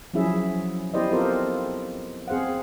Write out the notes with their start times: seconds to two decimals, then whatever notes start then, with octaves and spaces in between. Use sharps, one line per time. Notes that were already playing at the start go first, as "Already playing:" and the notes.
0.14 F3 F#3 C#4 E4 G#4 E5
0.94 B3 E4 G4 C5 D5 D#5
1.11 C4 F4 A4 A#4 C5
2.28 C4 G#4 C5 F5 F#5